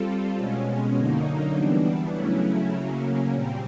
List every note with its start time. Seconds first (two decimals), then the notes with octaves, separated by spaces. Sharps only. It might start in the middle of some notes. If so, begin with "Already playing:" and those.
Already playing: G3 C4 F4 A4
0.38 B2 G#3 C#4
0.97 F#2 D3 F#3 A#3 D#4
1.56 E3 G3 B3 D4
2.15 C#3 F#3 A3 C#4 E4
2.73 C#3 F#3 A#3 C#4
3.33 A#2 G3 C4